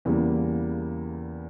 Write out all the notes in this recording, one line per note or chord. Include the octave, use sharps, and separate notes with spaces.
E2 C#3 G3 A#3 E4